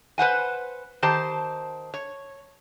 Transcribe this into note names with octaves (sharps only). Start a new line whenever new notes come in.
B4 C5 F#5 G#5
D#3 G4 C5 A5
C#5